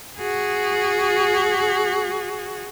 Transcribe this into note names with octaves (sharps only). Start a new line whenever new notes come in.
F#4 G#4